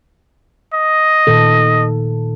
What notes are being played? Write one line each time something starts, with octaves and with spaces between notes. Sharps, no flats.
D#5
A#2 D#3 A4